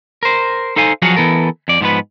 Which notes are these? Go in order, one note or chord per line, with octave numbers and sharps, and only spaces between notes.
A#4 C5
D#4 A4 C5 F5 G#5
F3 F#3 F#4 G#4 F5 F#5
E3 B3 A4 A#4
F2 D5
G#2 F3 B3 B4